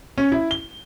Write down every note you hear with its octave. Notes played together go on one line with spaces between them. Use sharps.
C#4
E4
G7